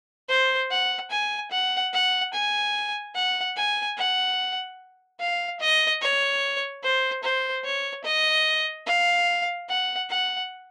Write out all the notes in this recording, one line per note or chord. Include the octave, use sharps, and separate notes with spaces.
C5
F#5
G#5
F#5
F#5
G#5
F#5
G#5
F#5
F5
D#5
C#5
C5
C5
C#5
D#5
F5
F#5
F#5